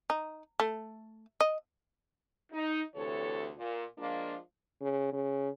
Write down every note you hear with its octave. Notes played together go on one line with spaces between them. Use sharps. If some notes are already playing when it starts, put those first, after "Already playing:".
D#4
A3
D#5
D#4
D2 C3 E3 A4 C#5
A#2
F3 G#3 A#3 D4 F4
C#3
C#3